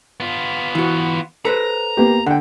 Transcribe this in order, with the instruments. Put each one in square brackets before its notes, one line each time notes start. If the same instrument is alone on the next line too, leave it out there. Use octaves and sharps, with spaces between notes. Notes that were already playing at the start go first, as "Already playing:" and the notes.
[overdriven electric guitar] B3 F4
[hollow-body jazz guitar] E3 F#4
[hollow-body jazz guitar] A4 B4 C5 [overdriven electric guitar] A#5
[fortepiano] A#3 B3 G4
[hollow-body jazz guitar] D3 [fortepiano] F#5 G5